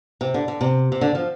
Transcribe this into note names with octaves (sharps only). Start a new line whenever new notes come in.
C3
D3
D3
C3
C3
D3
F3